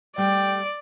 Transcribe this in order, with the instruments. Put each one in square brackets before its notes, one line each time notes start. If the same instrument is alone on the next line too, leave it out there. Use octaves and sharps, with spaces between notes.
[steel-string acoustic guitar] G3 A3 [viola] D5 [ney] G5